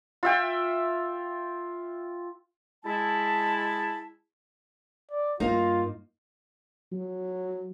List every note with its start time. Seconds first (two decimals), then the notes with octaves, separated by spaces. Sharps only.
0.23 F4 E5 G5
2.85 G#3 E4 A5
5.11 D5
5.40 G2 A#3 D#4 F4
6.93 F#3